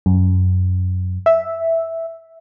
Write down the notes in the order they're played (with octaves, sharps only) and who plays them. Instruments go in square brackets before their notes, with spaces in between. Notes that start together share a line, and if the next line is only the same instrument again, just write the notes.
[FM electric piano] F#2
E5